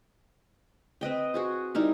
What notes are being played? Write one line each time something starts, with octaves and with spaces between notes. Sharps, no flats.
C4 B4 D#5 G5
F#4 G#4 C5
G3 D#4 E4 A#4